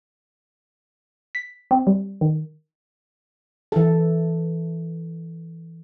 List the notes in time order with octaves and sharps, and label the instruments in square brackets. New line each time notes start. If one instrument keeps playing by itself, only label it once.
[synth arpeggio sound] B6
C4
G3
D#3
[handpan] E3 A4